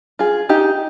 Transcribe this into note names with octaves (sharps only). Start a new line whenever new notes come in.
F4 G#4
D#4 G4